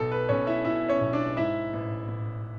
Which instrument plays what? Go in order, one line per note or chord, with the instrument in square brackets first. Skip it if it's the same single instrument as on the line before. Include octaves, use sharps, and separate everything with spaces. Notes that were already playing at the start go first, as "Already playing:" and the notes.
Already playing: [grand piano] B1 A4
B4
B1 C#4 C#5
E4 E5
B2 E4 E5
C#4 C#5
B1
D4 D5
G#2 E4 E5
A1
A1